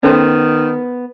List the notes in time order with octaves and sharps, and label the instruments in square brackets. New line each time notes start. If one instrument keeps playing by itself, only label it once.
[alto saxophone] D#3 [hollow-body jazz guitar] B3 C5 [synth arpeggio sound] C#4 A4 G5